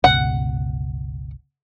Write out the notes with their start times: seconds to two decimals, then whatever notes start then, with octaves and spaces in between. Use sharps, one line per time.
0.04 G1 C#2 B2 F#5